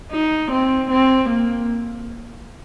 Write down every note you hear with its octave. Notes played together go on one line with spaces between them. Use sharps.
D#4
C4
C4
A#3